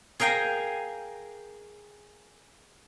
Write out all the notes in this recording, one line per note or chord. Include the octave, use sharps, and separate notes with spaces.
G#4 A#4 F5 G5 G#5 A#5